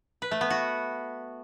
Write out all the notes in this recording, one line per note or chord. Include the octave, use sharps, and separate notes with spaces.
B4
A3
B3
F#4